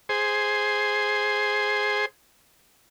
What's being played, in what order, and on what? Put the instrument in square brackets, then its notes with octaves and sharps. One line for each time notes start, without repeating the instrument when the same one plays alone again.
[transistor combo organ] G#4 C5